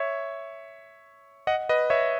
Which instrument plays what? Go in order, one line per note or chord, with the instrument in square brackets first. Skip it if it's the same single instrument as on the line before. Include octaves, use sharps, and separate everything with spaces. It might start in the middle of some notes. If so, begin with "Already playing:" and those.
Already playing: [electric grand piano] C#5 E5
D#5 F#5
B4 D#5
C#5 E5